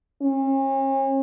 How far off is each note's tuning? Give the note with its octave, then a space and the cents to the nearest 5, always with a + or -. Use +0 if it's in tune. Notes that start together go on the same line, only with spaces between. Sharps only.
C#4 -40